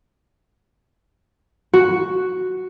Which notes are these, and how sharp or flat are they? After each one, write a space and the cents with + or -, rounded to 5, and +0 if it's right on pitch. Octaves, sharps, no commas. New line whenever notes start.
F#4 +0